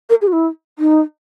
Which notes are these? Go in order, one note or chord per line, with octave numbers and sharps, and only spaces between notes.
A#4
G#4
F#4
E4
D#4